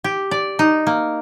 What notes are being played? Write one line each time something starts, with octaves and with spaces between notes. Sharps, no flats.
G4
D5
D#4
A#3